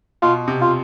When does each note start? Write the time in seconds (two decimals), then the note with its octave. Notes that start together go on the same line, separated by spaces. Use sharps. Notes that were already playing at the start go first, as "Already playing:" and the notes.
0.22 B2 F4
0.48 C3
0.61 F4